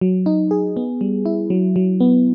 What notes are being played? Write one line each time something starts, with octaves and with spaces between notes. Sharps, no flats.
F#3
D#4
G#4
B3
G3
E4
F#3
F#3
B3